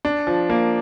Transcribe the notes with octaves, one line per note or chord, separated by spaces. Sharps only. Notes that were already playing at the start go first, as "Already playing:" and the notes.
D4
F3
A#3